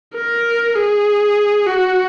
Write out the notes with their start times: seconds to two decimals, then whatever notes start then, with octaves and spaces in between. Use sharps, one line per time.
0.15 A#4
0.75 G#4
1.67 F#4